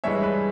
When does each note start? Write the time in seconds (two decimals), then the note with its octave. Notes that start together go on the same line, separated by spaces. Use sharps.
0.04 G2 E3 G#3 C#5 E5
0.23 B4